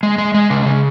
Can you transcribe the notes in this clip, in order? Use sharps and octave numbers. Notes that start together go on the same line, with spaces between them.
G#3
G#3
G#3
C#3
C#3